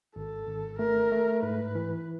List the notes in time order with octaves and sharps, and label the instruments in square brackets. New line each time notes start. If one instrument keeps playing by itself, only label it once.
[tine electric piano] G#1 [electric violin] A4
[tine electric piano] G#1
[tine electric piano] A3 [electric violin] A#4
[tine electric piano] A3
[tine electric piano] G#2 [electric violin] B4
[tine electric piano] E3